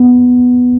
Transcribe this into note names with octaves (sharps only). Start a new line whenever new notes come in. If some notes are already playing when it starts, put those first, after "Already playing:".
Already playing: B3